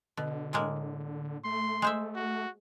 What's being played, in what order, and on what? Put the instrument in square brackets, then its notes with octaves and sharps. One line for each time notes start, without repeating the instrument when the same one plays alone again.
[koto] B2 [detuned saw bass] D3
[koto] A2 G#3 A#3
[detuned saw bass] A3 [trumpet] C6
[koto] G#3 C5 E5
[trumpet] F#4